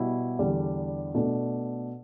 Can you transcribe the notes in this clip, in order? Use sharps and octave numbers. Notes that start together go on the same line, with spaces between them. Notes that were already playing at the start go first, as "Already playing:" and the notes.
Already playing: B2 G3 E4
E2 D3 G3 D4
B2 A3 D4